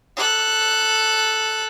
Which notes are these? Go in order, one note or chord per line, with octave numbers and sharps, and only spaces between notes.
A4 F#6